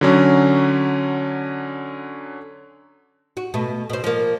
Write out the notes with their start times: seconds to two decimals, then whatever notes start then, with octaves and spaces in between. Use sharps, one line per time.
0.01 D3 F#3 C#4
3.37 F#4
3.54 B2 A3
3.90 B2 C5
4.04 F3 A#3